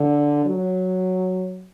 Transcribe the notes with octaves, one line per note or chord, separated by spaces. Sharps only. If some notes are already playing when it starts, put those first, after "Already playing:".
Already playing: D3
F#3